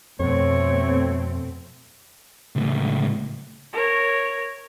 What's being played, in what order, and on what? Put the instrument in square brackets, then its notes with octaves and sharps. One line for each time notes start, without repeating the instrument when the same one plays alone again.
[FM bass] F2 [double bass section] B2 A3 C4 [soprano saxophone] C#5
[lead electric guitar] C#2 A2
[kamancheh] A#4 C#5